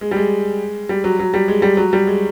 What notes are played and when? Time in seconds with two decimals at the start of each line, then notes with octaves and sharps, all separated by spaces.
0.01 G#3
0.11 G3
0.17 G#3
0.89 G3
1.04 F#3
1.19 F#3
1.34 G3
1.48 G#3
1.62 G3
1.77 F#3
1.93 G3
2.07 G#3